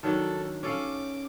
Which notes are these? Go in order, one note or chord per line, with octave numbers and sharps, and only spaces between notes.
D#3 F#3 D4 A4
C#4 A4 F5 D6